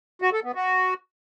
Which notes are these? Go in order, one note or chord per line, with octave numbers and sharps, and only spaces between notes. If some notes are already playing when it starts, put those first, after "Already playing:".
F#4
A4
B3
F#4